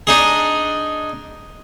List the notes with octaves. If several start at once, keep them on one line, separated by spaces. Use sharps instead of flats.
D4 D#4 G#4